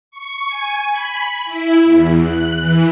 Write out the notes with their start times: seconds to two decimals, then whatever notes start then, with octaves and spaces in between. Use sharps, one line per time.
0.11 C#6
0.49 G#5
0.91 B5
1.45 E4
1.84 E2
2.20 F#6
2.57 E3